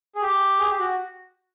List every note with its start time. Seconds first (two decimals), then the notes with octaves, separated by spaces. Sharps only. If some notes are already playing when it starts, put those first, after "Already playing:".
0.15 G#4
0.22 G4
0.59 G#4
0.70 G4
0.79 F#4